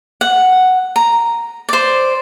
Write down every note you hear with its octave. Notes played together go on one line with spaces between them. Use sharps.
F#5
A#5
C5 D5